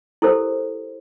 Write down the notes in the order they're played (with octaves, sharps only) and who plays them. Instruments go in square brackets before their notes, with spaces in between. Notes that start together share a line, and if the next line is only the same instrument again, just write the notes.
[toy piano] E4 G4 A4 A#4 C5